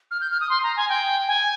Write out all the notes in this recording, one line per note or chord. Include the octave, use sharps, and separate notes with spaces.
F6
G6
F6
D#6
C6
A#5
G#5
G5
G#5